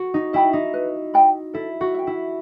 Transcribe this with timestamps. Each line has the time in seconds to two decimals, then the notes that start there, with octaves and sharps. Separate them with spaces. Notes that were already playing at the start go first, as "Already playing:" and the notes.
Already playing: F#4
0.14 D#4
0.33 E4 D#5 G5 B5
0.53 D#4
0.74 B4
1.14 D#5 G5 B5
1.54 E4 A4
1.81 F#4
1.94 E5 G5
2.07 E4